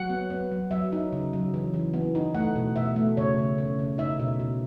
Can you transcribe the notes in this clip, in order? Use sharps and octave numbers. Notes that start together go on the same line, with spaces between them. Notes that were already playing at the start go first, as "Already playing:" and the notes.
Already playing: F#3 F#5
B3
B3
F#3
F#3 E5
D#4
C#3
F#3
E3
E3
B3
D#4
A3 F#5
B2
B2 E5
A3
C#3 C#5
C#3
C#3
C#3
D#4 E5
B2
B2